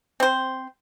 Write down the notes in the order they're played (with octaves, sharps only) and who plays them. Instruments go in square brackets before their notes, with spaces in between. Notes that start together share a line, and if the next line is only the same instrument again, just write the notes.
[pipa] C4 C5